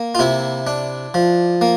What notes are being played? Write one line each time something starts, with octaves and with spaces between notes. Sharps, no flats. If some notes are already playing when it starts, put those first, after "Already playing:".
Already playing: A#3
F4
C3 E4
D4
F3
A#3